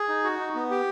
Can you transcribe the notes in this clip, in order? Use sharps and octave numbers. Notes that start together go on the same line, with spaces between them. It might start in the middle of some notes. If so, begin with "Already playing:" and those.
Already playing: G#4
D#4
F#4
D#4
B3
G4